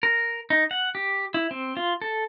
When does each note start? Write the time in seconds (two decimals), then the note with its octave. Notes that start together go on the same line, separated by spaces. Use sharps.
0.03 A#4
0.50 D#4
0.71 F#5
0.95 G4
1.34 E4
1.51 C4
1.77 F4
2.02 A4